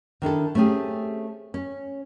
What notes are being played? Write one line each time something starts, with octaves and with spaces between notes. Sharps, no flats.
D#3 D4 E4 A4
A3 C4 C#4 G4 G#4
C#4